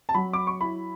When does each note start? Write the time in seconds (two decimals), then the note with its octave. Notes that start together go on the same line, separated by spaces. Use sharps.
0.09 A5
0.14 F#3 B5
0.33 D6
0.47 C#6
0.61 E4 B5